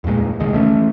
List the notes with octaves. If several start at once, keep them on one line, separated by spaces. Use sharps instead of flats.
E2 G2 A#2 G#3
C2 D#3 G#3
E3 A3 C#4